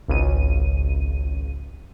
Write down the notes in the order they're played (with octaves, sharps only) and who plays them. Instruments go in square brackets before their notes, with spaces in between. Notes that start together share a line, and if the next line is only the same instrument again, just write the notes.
[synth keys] G#1 C#2 D#7